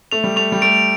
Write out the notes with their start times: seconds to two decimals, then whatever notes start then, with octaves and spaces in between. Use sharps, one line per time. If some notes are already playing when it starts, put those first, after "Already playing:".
0.12 A3 F7
0.24 G3
0.36 A3 F7
0.52 G3
0.62 A3 D7